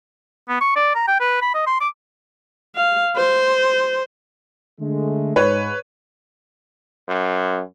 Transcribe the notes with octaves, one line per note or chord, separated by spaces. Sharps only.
B3
C#6
D5
A#5
G5
B4
B5
D#5
C6
D6
F5
C5
D3 G#3 A3
G#2 B4 C#5
F#2